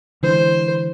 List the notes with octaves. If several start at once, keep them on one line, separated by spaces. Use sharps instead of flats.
D3 E3 G#3 C5